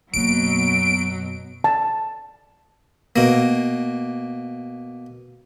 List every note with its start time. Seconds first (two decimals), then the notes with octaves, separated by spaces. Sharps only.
0.14 F#2 B2 F#3 A#3 D7
1.64 A5
3.16 B2 A#3